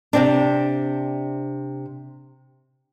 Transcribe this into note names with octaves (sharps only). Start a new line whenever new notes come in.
C3 C4 D4